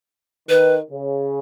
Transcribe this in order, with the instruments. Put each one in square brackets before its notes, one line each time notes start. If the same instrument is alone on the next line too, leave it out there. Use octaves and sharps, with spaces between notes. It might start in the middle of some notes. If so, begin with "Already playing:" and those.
[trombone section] D#3 [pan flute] B4
[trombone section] C#3